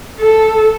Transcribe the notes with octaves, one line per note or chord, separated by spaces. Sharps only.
A4